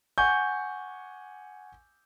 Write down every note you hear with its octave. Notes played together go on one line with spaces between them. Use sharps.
F#5 G#5 C#6 G6